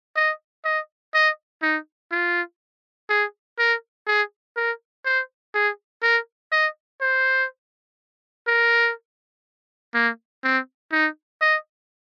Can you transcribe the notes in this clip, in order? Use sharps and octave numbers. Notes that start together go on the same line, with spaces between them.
D#5
D#5
D#5
D#4
F4
G#4
A#4
G#4
A#4
C5
G#4
A#4
D#5
C5
A#4
A#3
C4
D#4
D#5